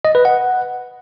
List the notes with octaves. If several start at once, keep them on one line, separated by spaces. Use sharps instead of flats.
D#5
B4
F#5